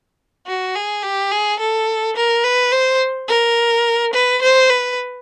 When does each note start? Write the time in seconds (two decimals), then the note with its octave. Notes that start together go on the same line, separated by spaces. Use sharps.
0.47 F#4
0.75 G#4
1.03 G4
1.31 G#4
1.59 A4
2.16 A#4
2.44 B4
2.72 C5
3.28 A#4
4.13 B4
4.42 C5
4.70 B4